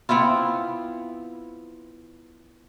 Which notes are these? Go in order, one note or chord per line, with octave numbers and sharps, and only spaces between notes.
B3 C4 E4 F4